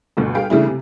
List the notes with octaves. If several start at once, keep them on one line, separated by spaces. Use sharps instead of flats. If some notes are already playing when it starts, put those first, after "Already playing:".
G1 D2 B2
G3 G#4 B4 F5 G5
C#3 E3 G3 A3 D4 E4
C3